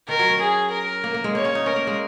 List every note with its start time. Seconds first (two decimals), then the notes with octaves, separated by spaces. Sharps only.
0.08 D#3 A#4
0.19 F#3
0.30 C#4
0.40 G#4
0.71 A#4
1.04 A#3
1.14 A#3
1.24 G#3
1.35 A#3 C#5
1.45 C#4
1.55 D#4
1.66 C#4 A#4
1.76 A#3
1.87 G#3